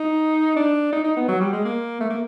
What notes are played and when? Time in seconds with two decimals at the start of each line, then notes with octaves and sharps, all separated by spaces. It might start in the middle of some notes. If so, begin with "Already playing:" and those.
Already playing: D#4
0.56 D4
0.92 D#4
1.04 D#4
1.16 B3
1.28 F#3
1.40 G3
1.53 G#3
1.65 A#3
2.00 A3
2.10 A#3